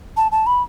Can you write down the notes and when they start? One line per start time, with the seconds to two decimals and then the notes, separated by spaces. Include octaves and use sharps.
0.17 A5
0.32 A5
0.47 B5